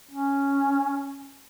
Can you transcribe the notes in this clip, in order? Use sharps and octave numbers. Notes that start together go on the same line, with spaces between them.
C#4